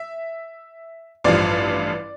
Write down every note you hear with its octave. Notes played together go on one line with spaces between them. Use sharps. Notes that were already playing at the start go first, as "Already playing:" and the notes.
Already playing: E5
A1 G2 F3 D5